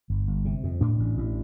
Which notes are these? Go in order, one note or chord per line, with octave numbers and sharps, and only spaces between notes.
G1
G1
C3
F2
A2 D4
A1
A1